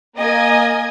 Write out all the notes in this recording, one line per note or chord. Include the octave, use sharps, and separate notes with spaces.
A#3 D#5 G#5